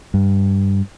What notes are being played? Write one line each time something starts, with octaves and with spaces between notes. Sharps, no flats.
G2